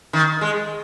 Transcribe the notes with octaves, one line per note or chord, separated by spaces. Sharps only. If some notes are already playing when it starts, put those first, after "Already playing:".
D#3
G#3